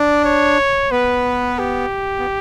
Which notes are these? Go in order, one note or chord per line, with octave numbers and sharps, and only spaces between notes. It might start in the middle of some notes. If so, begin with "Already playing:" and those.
Already playing: D4 D5
C#5
B3 B4
G4
B3